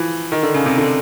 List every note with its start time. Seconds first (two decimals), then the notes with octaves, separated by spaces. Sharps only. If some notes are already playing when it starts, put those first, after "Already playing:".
Already playing: E3 F3
0.32 D#3
0.43 D3
0.54 C#3
0.66 C3
0.78 D3